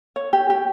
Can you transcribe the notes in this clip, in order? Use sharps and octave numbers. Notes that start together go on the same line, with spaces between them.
C#5
G4
G4